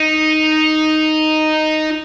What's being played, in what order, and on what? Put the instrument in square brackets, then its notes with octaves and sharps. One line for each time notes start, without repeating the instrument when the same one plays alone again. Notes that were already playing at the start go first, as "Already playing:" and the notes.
Already playing: [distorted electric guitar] D#4